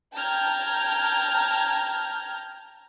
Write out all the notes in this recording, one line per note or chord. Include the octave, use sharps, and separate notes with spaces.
G5 A5 A#5 F6 G6 G#6